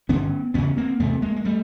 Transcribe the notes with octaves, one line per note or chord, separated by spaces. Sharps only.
G2 D3 B3 C#4
E2 C#3 B3 C#4
A#3 C4
E2 C3 A3 B3
G#3 A#3
A#3
G3 A3